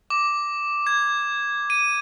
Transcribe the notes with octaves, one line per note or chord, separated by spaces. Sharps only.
D6
G#6
D#7